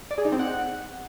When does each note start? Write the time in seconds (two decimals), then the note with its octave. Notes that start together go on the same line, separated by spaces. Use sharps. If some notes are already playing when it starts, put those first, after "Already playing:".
0.11 D5
0.18 G#4
0.25 D#4
0.32 C4
0.39 F#5